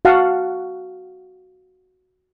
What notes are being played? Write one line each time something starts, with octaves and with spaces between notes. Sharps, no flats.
F#4 F5 F#5 A5